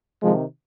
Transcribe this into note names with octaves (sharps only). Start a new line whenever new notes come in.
C3 D#3 F3 G#3